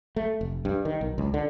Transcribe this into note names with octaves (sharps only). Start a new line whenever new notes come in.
A3
F1
G2
D#3
B1
C#2
D3